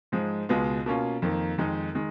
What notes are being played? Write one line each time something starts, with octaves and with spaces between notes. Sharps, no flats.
G#2 F3 G#3
C#2 B2 G#3 B3 F4
B2 A#3 C#4 F4
F2 D#3 A#3
F2 D#3 G#3 D#4
D#3 G#3